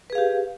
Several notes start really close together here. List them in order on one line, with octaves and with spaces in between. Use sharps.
B4 G#4 F5 G4